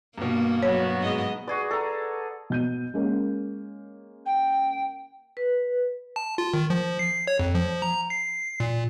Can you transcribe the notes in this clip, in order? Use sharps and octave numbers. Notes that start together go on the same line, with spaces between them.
G2 B2 A#3
F#3 B3 F#4 C#5
G#2 D#5
F#4 G#4 B4 D5
A4 A#5
B2 G6 D#7
G#3 A#3 C#4
G5
B4
A5
F4
D#3
F3
C7
C#5
F2
F3
A#5
C7
A#2